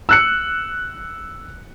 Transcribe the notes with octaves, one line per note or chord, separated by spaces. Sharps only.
E6 F#6 C#7